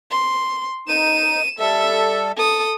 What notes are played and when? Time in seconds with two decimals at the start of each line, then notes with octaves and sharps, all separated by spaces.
0.11 C6
0.88 D#4 D#7 E7
1.59 G3 A4 E5
2.36 A4 D#6